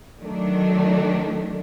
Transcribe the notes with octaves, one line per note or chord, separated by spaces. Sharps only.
D#3 F#3 A3 D4